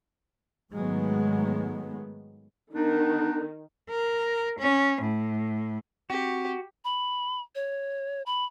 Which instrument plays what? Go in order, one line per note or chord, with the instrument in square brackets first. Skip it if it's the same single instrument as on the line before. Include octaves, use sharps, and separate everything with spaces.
[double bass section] G#2 D#3 F#3 G#3 A3 B3
[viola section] D#3 [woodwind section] B3 D4 D#4
[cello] A#4
C#4
A2
[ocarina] C4 [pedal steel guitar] F#4 [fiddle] G4
[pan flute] B5
C#5
B5